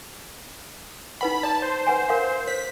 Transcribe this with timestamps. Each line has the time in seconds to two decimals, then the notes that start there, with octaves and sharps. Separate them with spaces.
1.21 D#4 B4 F#5 B5
1.43 D5 A5 A#5
1.62 C5
1.87 B4 F#5 G#5
2.08 A#4 F5 F#5
2.48 C5 B6